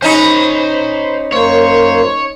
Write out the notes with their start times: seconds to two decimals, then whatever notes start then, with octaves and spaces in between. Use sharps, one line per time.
0.02 C#4 D#4 C5 B5
1.32 F#2 A#3 C5 C#5